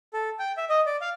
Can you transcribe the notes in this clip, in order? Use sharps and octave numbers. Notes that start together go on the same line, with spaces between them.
A4
G5
E5
D#5
D5
F5